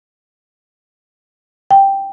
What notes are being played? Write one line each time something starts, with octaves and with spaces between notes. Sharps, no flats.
G5